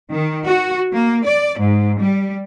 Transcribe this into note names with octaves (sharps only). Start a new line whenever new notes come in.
D#3
F#4
A#3
D5
G#2
G3